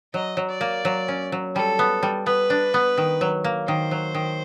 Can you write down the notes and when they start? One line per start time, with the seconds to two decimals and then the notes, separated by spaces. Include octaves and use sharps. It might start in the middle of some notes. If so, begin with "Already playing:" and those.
0.14 F#3 D#5
0.37 F#3
0.49 D5
0.61 A#3
0.85 F#3
1.08 C#4
1.32 F#3
1.55 G3 A4
1.79 B3
2.03 G3
2.26 B3 B4
2.50 D4
2.74 B3
2.97 D#3
3.21 F#3
3.44 A#3
3.68 D#3 C5
3.91 F#3
4.14 D#3